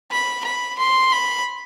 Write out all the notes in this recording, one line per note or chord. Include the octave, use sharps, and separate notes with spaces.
B5
B5
C6
B5